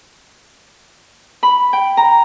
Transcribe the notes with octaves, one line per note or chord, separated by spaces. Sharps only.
B5
G5
A#5